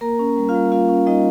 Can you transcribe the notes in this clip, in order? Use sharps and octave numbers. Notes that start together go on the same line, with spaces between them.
A#3 A#4 A#5
C#4
G3
F4 F5
G3
A#3 F4 F5
C#4
G3 D#4 D#5